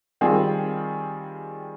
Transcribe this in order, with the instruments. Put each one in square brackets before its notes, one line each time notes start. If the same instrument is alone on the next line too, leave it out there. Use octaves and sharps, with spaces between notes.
[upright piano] D#3 G3 C4 F4 G#4